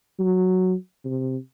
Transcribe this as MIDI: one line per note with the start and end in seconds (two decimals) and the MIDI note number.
0.19 0.74 54
1.05 1.36 48